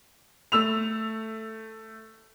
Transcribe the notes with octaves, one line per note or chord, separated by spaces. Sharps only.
A3 E6 F7